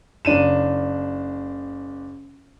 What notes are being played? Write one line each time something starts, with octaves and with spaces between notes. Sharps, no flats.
F#1 D4 D#7 E7